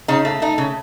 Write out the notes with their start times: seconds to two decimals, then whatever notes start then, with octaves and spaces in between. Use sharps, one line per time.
0.08 C#3 D#4
0.25 A3
0.42 A3 D#4
0.58 C#3